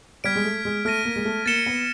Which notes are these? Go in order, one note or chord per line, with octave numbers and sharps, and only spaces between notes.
G3 F6 G#6 B6 D7
G#3
A3
G#3
A3 F6 A#6 D#7
A#3
G#3
A3
A#3 A6 C#7 E7 G7
B3